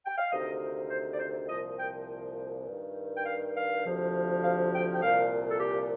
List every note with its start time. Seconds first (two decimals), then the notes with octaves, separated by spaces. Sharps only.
0.06 G5
0.18 F5
0.31 D2 C3 D#3 D#5
0.90 C5
1.12 D5
1.20 C5
1.49 C2 A#2 F3 D#5
1.78 G5
2.67 G2 D#3
3.16 G5
3.26 F5
3.55 F5
3.85 D2 C3 F3
4.44 F5
4.73 G5
4.93 G5
5.02 C2 A#2 F3 F5
5.51 A4
5.60 G4